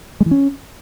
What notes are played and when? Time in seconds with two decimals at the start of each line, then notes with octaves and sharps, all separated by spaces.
0.20 G#3
0.26 E3
0.31 C#4